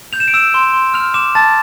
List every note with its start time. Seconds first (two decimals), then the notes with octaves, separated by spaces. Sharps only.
0.13 G6 F7
0.20 E7
0.28 D7
0.34 E6 E7
0.54 C6
0.73 C6
0.94 F6 F7
1.14 D6 E7
1.35 A5 A6